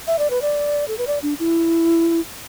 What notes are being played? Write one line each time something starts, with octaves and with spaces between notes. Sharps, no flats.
E5
D5
B4
D5
A4
B4
D5
D4
E4